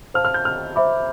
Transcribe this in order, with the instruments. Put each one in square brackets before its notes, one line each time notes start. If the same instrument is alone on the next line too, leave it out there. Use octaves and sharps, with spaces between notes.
[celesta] C5 F5 A5 [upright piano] F6
[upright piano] F6
G6
F6
[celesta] C5 E5 B5 D6